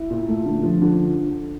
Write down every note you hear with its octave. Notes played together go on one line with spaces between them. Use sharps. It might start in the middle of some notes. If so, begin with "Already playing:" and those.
Already playing: E4
A#2
A3
D3
F3
D3